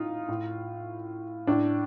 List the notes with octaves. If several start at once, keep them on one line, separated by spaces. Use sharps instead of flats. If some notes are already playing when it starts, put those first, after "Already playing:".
Already playing: A2 D#4 F4
A2
A2 D4